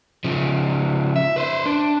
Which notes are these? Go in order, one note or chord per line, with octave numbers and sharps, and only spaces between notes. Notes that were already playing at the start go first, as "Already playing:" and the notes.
C#3 F3
E5
B4 C5
D4